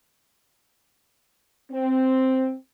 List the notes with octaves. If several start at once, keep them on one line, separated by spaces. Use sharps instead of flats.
C4